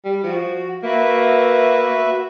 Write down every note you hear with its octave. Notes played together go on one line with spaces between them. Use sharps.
G3
F3 F#4
A#3 F#4 B4 E5